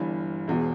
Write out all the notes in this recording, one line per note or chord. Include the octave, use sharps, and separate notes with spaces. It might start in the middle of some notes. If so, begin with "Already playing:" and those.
Already playing: G1 G2 E3
E1 E2 B2